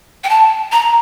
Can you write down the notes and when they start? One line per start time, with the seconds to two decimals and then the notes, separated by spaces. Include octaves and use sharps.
0.24 G5
0.29 A5
0.72 A#5